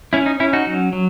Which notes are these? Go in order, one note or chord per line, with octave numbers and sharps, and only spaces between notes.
C#4 E4
D#4
C#4 E4
D#4 F#4
F#3
F#3